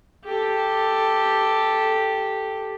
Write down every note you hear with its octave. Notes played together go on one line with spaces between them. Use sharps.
G4 A4